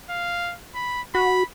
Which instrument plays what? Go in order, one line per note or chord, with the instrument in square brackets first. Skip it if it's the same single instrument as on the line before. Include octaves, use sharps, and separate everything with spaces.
[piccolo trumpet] F5
B5
[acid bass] F#4 [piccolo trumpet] B5